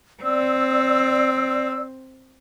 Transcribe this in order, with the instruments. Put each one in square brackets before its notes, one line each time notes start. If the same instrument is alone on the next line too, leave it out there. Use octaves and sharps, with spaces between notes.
[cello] C4 [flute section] D5 E6